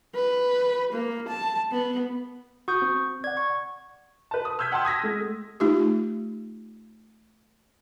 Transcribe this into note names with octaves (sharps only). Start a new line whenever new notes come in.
B4
A#3
A5
B3
F#4 C#6 D#6 G6
C4
D5 F#5 G#6
C#6
B4 A5
D#6
E6 F6 G6 G#6 B6
F#5 G5 A5 C6 E6
D#6 G#6 A#6 B6
G#3 A3
A3 D#4 F4 G4